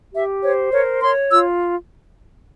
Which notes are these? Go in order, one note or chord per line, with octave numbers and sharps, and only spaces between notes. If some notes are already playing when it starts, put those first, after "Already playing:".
G4 E5
C5 C#5
A#4 C#5
C#5 C6
F4 E6